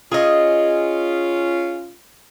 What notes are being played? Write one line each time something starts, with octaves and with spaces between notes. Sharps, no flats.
C#4 F4 G#4 D#5